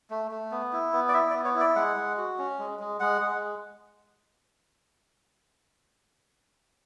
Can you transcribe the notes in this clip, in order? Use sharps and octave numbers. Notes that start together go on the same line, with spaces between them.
A3
A3
B3
E4
B3
D5
E4 E5
D5
B3
C#5
E4 D5
G#3 F#5
G#3
F#4
C#4
G#3
G#3
G#3 F#5
G#3